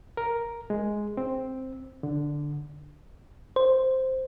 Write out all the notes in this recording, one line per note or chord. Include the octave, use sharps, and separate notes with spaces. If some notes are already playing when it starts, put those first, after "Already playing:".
A#4
G#3
C4
D3
C5